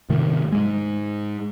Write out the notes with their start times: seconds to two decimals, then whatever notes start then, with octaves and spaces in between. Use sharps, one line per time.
0.09 G#2 C3 D#3 A3
0.52 G#2 G#3